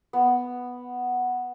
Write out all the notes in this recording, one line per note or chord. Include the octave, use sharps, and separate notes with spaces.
B3